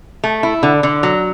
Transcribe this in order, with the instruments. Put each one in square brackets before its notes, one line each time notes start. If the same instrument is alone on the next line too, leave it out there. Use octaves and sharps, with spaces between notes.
[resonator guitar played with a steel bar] A3
E4
D3
D3
F#3